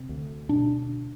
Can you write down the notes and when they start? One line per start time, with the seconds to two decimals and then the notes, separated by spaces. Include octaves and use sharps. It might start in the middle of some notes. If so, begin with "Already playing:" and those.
Already playing: C3 C4
0.09 D2
0.49 B2 D4